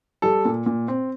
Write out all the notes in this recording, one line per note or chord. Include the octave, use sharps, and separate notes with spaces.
G3 A4
A#2
A#2
C4